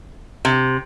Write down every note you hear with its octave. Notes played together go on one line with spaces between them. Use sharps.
C3